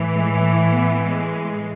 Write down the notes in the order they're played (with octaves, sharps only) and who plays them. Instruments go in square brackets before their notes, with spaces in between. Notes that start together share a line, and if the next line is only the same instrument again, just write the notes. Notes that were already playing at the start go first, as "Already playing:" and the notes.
Already playing: [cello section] A2 E3
G#3
A3
B3
G#3